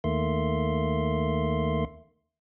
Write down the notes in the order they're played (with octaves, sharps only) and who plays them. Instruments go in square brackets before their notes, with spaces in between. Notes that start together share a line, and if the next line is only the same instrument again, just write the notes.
[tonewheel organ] D#2 D#3 A3 A#3 E5 C6